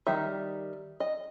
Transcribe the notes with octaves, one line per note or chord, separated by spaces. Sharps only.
D#3 G3 D#4 E5
D#5